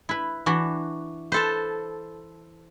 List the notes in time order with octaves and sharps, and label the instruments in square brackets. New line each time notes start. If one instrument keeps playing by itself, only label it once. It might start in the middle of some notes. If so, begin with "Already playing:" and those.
[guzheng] E4 B4
E3 D4 F#4
[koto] A4 C5 [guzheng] B4 A5